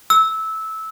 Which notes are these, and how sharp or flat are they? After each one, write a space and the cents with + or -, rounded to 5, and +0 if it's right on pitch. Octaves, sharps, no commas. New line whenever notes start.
E6 -15